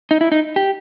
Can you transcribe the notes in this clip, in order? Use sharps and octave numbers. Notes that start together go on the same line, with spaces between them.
D#4
E4
D#4
G4